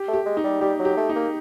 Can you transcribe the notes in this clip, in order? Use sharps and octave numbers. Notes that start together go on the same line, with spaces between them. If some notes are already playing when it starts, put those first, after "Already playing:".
Already playing: G4
A3
G4
G#3
D#4
G3
G3 G4
F#3
G4
A3
D#4
A#3